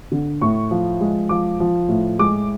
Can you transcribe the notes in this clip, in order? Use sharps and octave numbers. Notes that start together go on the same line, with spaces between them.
D3
A2 C#6
F3
G#3
F3 D6
F3
A2
G#3 D6